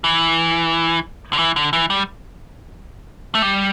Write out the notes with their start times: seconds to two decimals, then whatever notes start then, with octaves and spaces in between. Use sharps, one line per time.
0.04 E3
1.33 D3
1.39 E3
1.56 D3
1.73 E3
1.90 G3
3.35 A3
3.42 G3